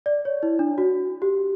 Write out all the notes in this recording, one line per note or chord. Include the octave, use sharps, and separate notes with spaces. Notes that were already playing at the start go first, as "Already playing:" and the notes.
D5
C#5
E4
D4
F#4
G4